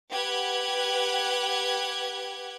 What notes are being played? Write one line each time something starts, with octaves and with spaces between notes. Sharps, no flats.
G4 B4 F#5 F#6 G#6